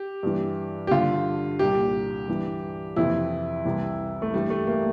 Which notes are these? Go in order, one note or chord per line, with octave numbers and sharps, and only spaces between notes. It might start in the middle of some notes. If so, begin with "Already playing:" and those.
Already playing: G4
G2 E3
G4
G2 D3 F4
C2 A#2 G4
G2 E3
F2 C3 E3 E4
C2 C3 E3
A3
G2 E3 G3
A3
A#3